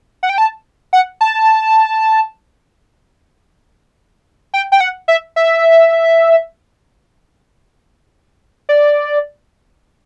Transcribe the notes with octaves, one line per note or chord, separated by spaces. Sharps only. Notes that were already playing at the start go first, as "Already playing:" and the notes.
F#5
G5
A5
F#5
A5
G5
G5
F#5
E5
E5
D5